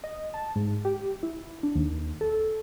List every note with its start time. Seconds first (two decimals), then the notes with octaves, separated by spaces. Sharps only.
0.04 D#5
0.34 A5
0.56 G#2
0.85 G4
1.23 E4
1.63 D4
1.75 D#2
2.21 A4